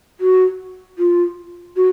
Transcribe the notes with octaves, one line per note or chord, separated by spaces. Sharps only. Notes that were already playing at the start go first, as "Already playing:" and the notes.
F#4
F4
F#4